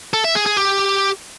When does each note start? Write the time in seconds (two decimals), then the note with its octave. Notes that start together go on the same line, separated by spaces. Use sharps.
0.13 A4
0.24 E5
0.35 G#4
0.46 G#4
0.57 G4